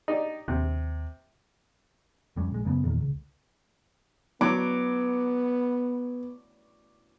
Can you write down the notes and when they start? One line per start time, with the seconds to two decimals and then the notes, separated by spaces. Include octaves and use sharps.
0.08 D#4 G4 D5
0.48 D#2 C3
2.36 F2 G3 C#4
2.51 A#1 G#3
2.65 F#2 C#3 A3 B3
2.83 E2 A#2 D#3
3.01 C#2
4.41 F#3 B3 D6